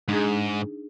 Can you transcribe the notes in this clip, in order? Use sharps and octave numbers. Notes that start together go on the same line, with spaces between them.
G#2 D4 D#4 G#4